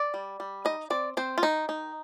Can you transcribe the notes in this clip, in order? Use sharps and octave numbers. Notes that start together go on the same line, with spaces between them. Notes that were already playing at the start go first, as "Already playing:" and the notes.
Already playing: D5
G3
G3
D#4 D#5
C4 D5
C4 C5
F4
D#3 D#4
D#4